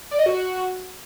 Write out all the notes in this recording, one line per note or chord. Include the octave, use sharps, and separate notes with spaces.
D5
D#5
F#4